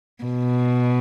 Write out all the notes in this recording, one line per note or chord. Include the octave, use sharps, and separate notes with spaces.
B2